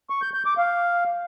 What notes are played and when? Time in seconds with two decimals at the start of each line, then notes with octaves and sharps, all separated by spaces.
0.10 C#6
0.22 G6
0.34 G6
0.46 D6
0.58 F5